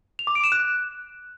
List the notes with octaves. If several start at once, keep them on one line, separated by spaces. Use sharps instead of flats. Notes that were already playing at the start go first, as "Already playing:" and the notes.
F7
D6
D7
E7
F#6